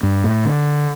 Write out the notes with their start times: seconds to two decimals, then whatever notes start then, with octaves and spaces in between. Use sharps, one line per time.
0.03 G2
0.24 A2
0.45 D3